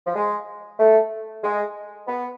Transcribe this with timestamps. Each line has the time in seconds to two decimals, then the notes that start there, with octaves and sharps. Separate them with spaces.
0.06 F3
0.16 G#3
0.79 A3
1.43 G#3
2.07 B3